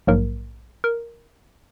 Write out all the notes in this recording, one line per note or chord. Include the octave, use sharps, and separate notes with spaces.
A#1 G#2 F#3 A#3 A#4
A#4